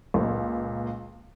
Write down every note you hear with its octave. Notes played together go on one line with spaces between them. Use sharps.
C#2 A#2